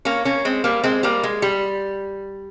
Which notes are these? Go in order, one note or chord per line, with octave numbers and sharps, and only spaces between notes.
A#3 C#4
A#3 C#4
G#3 C4
G3 A#3
G#3 C4
G3 A#3
G#3
G3